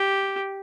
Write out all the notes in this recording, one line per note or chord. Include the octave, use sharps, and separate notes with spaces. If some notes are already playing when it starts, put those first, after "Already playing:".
Already playing: G4